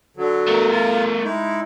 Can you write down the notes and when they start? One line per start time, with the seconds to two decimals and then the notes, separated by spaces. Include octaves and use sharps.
0.17 D3 F#3
0.48 A3 A#4
0.71 F4
1.24 G#3 D#4 E4